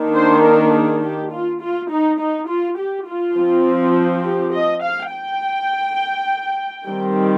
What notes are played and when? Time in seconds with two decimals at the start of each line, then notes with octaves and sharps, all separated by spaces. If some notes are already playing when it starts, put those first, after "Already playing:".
Already playing: D#3 A#3 D4
0.16 C5
0.44 A#4
0.74 G#4
1.03 G4
1.32 F4
1.62 F4
1.90 D#4
2.19 D#4
2.49 F4
2.78 G4
3.08 F4
3.36 F3 C4
4.25 G4
4.53 D#5
4.82 F5
5.11 G5
6.87 D#3 G3 C4